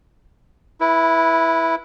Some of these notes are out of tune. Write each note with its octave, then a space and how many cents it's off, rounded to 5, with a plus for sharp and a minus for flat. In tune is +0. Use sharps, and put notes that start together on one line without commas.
E4 +0 B4 -25